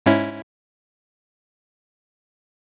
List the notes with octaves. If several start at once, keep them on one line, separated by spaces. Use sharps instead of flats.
G#2 C#4 E4